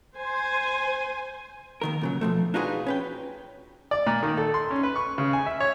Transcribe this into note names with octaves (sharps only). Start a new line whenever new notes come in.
C5 G#5
D#2 D#3 A#4
A#2 C#3 F#3
B2 F3 A3
D4 D#4 F4 F#4 G#4 B4
C#4 B4 G5
D5
A#2
D#3
A4
C6
C#4
B4
C#6
C#3
G#5
E5
C#5